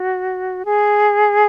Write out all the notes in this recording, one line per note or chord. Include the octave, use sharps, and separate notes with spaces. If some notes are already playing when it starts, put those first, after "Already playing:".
Already playing: F#4
G#4